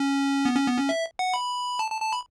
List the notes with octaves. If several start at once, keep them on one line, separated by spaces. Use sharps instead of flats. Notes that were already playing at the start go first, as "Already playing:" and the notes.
Already playing: C#4
B3
C#4
B3
C#4
E5
F#5
B5
A5
A5
A5
B5